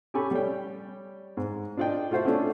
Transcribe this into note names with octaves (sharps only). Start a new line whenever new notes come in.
C#4 G4 A4 G#5 B5 C#6
G3 C#5 G5
G#2
D4 F4 D5 D#5 G5
A3 F4 F#4 C5 E5
A3 C#4 D4 F4